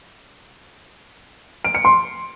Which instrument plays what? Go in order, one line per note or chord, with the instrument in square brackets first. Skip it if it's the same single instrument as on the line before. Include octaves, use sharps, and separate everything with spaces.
[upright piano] D7
C#7
C6